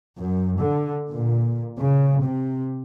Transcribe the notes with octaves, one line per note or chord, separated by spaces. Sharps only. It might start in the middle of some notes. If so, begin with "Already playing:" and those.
F#2
D3
A#2
C#3
C3